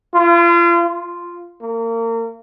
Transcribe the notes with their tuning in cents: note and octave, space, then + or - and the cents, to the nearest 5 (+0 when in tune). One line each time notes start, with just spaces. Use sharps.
F4 -35
F4 -5
A#3 -30